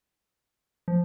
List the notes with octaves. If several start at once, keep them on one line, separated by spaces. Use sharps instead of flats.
F3